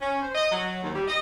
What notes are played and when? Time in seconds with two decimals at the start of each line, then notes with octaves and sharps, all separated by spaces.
0.01 C#4
0.22 C5
0.35 D#5
0.51 F#3
0.82 D#2
0.94 G3
1.08 D#5